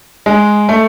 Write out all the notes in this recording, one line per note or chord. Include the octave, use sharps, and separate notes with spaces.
G#3
A3